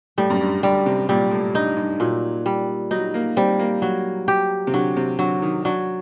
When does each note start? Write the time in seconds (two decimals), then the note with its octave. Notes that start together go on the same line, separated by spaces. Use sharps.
0.18 A2 G3
0.30 F#2
0.41 G2
0.63 D3 G3
0.86 C3
1.09 A#2 G3
1.31 A2
1.54 G2 D#4
1.77 G2
2.00 A#2 F#3
2.46 G3
2.91 F#3 D#4
3.14 A#3
3.37 G3 C4
3.59 A#3
3.82 F#3
4.28 G4
4.67 C3
4.73 D3 F#3
4.97 C3
5.19 D3 F#3
5.42 D#3
5.65 F#3 D4